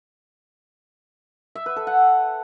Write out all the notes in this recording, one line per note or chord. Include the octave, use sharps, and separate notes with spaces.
E5
B4
A4
F#5